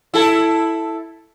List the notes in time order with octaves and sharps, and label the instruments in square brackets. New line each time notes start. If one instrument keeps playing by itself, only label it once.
[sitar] E4 A4